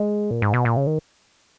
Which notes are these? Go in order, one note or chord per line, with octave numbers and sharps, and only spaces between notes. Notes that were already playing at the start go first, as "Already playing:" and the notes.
Already playing: G#3
A#2
G#2
B2
A#2
C#3
D#3